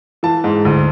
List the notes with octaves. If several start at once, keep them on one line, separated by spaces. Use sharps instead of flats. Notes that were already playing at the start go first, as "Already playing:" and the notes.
E3 A5
G#2
D2